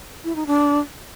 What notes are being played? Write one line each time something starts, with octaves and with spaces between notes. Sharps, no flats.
E4
D#4
D4